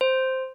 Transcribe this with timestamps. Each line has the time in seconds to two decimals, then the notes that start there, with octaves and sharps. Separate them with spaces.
0.01 C5